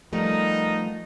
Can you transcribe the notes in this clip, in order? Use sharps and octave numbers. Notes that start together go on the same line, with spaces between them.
F3 G3 A3 B3 D#4 A#4